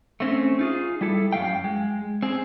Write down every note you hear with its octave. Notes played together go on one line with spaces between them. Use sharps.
A3 C4 C#4
D#4 F4 G#4
G3 E4 A4
F#2 G3 F5 G5
G#3
C4 G#4